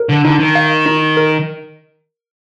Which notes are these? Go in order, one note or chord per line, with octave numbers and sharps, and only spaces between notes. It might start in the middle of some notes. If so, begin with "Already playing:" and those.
Already playing: A#4
D3
D3 D#4
D#3
F5
D#4
A#4